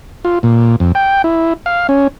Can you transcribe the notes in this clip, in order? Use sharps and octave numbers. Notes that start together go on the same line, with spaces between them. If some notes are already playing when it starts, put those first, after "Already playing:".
F4
A#2
F2
G5
E4
F5
C#4